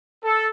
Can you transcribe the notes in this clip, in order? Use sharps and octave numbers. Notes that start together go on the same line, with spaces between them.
A4